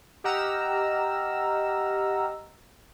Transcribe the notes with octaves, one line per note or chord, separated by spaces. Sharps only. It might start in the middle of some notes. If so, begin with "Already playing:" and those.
G4 D#5 F#5 A#5 E6 F6